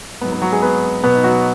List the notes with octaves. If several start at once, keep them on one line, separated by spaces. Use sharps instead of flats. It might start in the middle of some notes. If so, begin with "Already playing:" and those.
G#2 F#3 B3
B3
F#3 F#4
G#3 G#4
B3 B4
B2 F#3 B3 B4
D#4
F#3 F#4